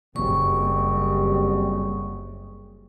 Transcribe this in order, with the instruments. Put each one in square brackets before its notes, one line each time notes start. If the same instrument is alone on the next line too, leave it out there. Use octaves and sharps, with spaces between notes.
[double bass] F#1 [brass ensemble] C3 G3 [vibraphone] C#6